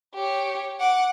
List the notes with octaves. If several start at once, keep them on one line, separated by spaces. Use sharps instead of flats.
G4 C#5
F#5 D6